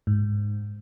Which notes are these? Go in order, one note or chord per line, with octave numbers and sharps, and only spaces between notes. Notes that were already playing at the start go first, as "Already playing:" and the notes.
G#2